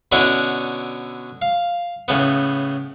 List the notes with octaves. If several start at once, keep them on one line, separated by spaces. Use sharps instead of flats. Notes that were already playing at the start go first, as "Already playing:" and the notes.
B2 D3 C#4 D4 E4
F5
A2 C#3 B3